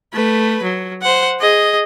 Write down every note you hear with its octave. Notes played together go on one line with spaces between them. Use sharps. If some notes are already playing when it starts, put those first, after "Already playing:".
A3 B4
F#3
C5 F#5
G#4 D#5